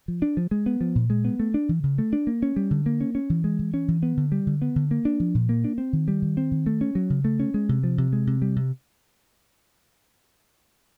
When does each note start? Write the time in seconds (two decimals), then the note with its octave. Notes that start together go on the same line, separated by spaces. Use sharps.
0.08 F3
0.22 D4
0.37 F3
0.51 G#3
0.66 B3
0.81 F3
0.95 A#2
1.10 G#3
1.25 B3
1.40 A3
1.54 D4
1.69 E3
1.83 C#3
1.98 A3
2.13 D4
2.27 A#3
2.42 C#4
2.56 G3
2.71 D3
2.86 A#3
3.01 C#4
3.15 C#4
3.30 E3
3.44 G#3
3.59 E3
3.74 C#4
3.88 E3
4.03 B3
4.17 D3
4.32 G3
4.47 D3
4.62 B3
4.76 D3
4.91 A#3
5.05 D4
5.20 F3
5.35 A#2
5.49 A#3
5.64 D4
5.78 C4
5.93 D#3
6.08 G3
6.22 D#3
6.37 C4
6.52 D#3
6.66 A3
6.81 C#4
6.95 F#3
7.10 C#3
7.25 A3
7.40 C#4
7.54 G#3
7.69 C3
7.84 F3
7.98 C3
8.13 G#3
8.27 C3
8.42 G3
8.56 C3